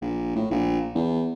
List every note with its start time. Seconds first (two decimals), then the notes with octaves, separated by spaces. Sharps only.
0.02 A#1
0.36 A2
0.51 A#1
0.95 E2